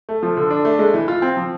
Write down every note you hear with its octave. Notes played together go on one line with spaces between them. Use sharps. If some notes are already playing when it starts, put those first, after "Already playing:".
A3
F3
D3
D4
A3
G#3
E3
F4
C4
F3